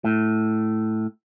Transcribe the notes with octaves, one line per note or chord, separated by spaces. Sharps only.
A2